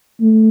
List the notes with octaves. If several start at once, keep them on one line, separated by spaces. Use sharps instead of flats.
A3